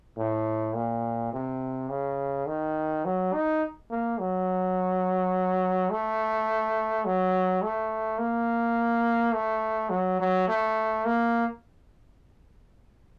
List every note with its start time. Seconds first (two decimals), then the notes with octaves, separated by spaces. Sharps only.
0.18 A2
0.75 A#2
1.33 C3
1.90 C#3
2.47 D#3
3.05 F#3
3.33 D#4
3.91 A#3
4.19 F#3
5.90 A3
7.05 F#3
7.62 A3
8.19 A#3
9.34 A3
9.90 F#3
10.20 F#3
10.48 A3
11.05 A#3